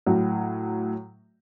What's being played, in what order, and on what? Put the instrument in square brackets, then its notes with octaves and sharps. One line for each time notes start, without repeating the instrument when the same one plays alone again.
[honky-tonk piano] A2 F#3